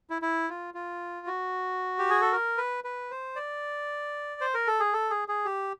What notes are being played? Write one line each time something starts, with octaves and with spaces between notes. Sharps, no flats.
E4
E4
F4
F4
F#4
G4
G#4
A4
A#4
B4
B4
C5
D5
C5
A#4
A4
G#4
A4
G#4
G#4
G4